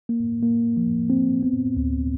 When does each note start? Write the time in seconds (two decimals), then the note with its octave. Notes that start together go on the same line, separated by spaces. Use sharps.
0.09 A#3
0.43 A#3
0.77 F3
1.10 C4
1.43 B3
1.76 D2